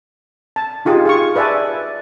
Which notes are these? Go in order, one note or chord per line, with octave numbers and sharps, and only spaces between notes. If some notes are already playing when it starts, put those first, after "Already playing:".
A5
D#4 F4 G4 G#4
G#4 F5 C#6
B4 D5 E5 G#5 A5